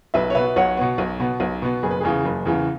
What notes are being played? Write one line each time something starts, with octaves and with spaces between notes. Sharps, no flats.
B1 B4 E5
C#5
B2 B3 B4 E5
B1 C#5 F#5
B2 B3
B1
B2 B3
B1
B2 B3
F#1 G#4
B4
E2 C#3 E3 G#4
F#1
E2 C#3 E3